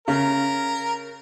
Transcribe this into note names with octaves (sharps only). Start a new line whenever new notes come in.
C#3 A#4